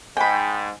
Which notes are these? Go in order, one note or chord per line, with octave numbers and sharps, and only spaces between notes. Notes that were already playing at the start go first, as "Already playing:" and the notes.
G#2 G5 G#5 B5